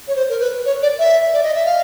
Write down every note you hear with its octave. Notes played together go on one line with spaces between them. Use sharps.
C#5
C5
A#4
B4
C#5
D5
E5
D5
D#5
E5
F5